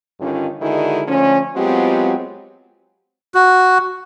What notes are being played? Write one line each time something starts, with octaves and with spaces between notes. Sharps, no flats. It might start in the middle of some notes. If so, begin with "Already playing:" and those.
G2 D3 D#3 C#4 F4
D3 D#3 G#3 E4 F#4 G#4
D3 F3 A3 C#4
F#3 G#3 B3 C4 F4 G4
F#4